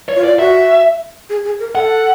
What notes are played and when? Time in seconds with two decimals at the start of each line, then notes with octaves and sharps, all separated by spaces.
0.09 C#5
0.16 F4
0.24 D5
0.27 F4
0.39 F#4 E5
1.30 G#4
1.45 G#4
1.60 A#4
1.75 A4 F#5